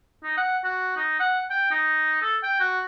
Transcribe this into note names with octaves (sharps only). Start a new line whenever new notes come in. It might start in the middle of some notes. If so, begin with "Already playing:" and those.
D#4
F#5
F#4
D#4
F#5
G5
D#4
A4
G5
F#4